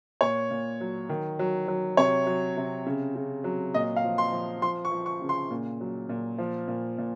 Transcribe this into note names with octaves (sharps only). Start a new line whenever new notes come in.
A#2 C#5
A#2
F#3
D#3
F#3
F#3
C3 C#5
F#3
C3
C#3
C#3
F#3
A#2 D#5
F5
F3
C6
F3
F3 C6
C#6
F3
C#6
C#3
C6
A#2
F#3
A#2
F3
A#2
A#2